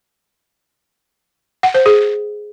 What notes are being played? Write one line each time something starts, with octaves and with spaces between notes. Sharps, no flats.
F#5
C5
G#4